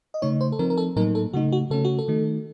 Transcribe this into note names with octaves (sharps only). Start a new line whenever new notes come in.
D#5
C#3 A3 D#4 C#5
C5
A4
F3 C4 D#4 A#4
A#4
A4
A2 F#3 A#3 D#4 A#4
A4
C#3 A3 D#4 F#4
F#4
C#3 A3 C#4 A4
F#4
A4
D#3 A3 D#4